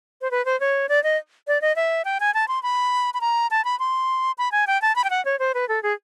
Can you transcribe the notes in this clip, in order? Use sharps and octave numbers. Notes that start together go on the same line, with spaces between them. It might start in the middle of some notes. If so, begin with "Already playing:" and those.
C5
B4
C5
C#5
D5
D#5
D5
D#5
E5
G5
G#5
A5
C6
B5
B5
A#5
A5
B5
C6
B5
G#5
G5
A5
B5
G5
F#5
C#5
C5
B4
A4
G#4